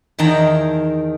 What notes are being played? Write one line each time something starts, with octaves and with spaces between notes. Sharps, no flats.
E2 D#3 G5 A5 A#5